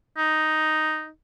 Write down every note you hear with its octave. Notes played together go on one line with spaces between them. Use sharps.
D#4